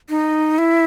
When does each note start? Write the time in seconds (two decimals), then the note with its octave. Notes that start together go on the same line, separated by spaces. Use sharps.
0.09 D#4
0.58 E4